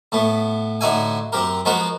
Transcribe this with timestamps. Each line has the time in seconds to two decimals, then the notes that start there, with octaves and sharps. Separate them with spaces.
0.12 A2 A3 B3
0.81 A2 D3 D#4 F#4 E5 G#5
1.33 F#2 C4 G4 A#4
1.65 F3 G#3 B3 F#4 A#4 B4